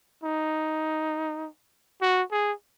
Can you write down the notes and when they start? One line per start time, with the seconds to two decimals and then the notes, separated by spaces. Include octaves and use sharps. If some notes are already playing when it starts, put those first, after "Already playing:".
0.23 D#4
2.01 F#4
2.31 G#4